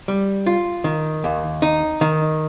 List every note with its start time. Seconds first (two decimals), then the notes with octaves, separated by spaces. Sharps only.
0.08 G3
0.47 F4
0.84 D#3
1.24 D#2
1.62 D#4
2.01 D#3